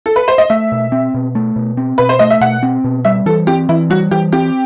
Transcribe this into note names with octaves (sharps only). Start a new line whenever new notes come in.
A4
B4
C5
D#5
A3 E5
B2
C4
B2
A3
B2
C4
B2 B4
C5
A3 D#5
E5
B2 F#5
C4
B2
G3 E5
E3 A4
C4 G4
E3 E4
G3 F#4
E3 G4
C4 G4